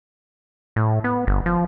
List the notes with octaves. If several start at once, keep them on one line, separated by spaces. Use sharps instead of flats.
A2
B3
G1
F3